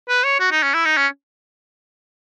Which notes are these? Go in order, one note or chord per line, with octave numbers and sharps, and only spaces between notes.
B4
C#5
F#4
D#4
C#4
E4
D#4
C#4